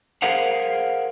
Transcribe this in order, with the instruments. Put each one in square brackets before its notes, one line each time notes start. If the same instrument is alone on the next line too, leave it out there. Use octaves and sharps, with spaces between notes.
[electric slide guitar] G#4 A#4 C5 F5 F#5